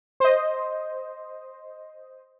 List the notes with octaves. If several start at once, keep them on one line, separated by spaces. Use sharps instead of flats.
C5 D#5